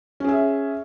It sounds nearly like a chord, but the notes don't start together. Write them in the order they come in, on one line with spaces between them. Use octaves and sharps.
C#4 G#4 E5